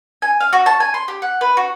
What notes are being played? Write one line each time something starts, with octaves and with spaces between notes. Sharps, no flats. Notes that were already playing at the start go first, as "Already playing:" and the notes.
G#5
F5
F#4
A5
G#5
C6
G4
F#5
B4
F#4